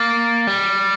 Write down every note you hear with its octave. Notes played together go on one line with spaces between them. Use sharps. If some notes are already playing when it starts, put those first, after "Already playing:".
Already playing: A#3 A6
G3